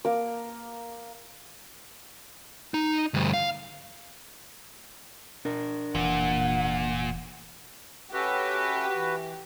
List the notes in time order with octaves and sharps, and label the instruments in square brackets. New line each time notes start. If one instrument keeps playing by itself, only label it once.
[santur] A#3 D6
[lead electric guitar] D#4
D2 G2
F5
[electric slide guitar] D4 A#4
[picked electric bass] F1 E3 [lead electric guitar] A#2 [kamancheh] F#5
[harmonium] C#4 A4 E5 [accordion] F#4 B4 [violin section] G4
[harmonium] E3